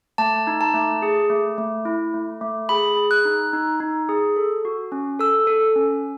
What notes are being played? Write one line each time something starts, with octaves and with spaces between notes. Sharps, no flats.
A3 A5
D#4
A5
A3
G#4
A3
A3
E4
A3
A3
G#4 B5
G#4
F#6
D#4
D#4
D#4
G#4
A4
F#4
C#4
A4 E6
A4
C#4